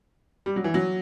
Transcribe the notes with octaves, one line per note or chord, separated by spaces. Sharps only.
G3
F#3
E3
F#3